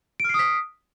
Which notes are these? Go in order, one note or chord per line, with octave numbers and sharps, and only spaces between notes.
D#6 F6 B6 C7 D7